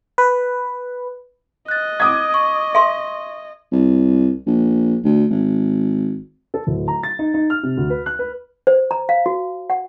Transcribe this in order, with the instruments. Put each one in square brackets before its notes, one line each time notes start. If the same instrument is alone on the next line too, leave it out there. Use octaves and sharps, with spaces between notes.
[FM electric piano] B4
[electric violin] D#5 [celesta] F#6 A6
[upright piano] D6 D#6 G#6
[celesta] C#6
[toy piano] E5 C6
[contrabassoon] C2
A#1
D2
G#1
[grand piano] A4
D1
A#5
A6
D#4
D#4
F6
C3
D2
B4
F#6
B4
[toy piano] C5
A#5
F5
F#4
F#5